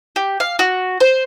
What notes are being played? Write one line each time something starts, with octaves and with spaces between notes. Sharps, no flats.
G4
F5
F#4
C5